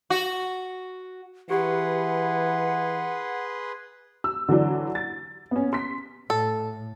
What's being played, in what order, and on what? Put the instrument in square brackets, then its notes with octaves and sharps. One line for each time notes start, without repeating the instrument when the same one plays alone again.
[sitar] F#4
[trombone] E3 [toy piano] G4 [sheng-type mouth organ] G#4 B4 C6 [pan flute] F#5
[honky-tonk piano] E6
D3 E3 F#3 D4
A6
B3 C#4
C6 B6
[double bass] A2 [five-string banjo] A4